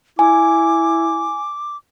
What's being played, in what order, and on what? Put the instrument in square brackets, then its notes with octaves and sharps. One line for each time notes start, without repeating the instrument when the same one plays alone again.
[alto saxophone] E4 [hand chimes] G#5 [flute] D6